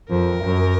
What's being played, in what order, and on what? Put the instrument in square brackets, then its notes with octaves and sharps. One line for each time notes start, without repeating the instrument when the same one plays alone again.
[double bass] F2 [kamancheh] A#4
[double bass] F#2